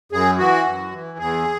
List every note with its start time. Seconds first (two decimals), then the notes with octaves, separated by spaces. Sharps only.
0.12 F#2 G#4
0.38 E3 F#4
0.66 F#2
0.92 E3
1.18 E2 G#4